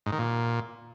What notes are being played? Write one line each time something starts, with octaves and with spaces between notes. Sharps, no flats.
G#2
D#3
A#2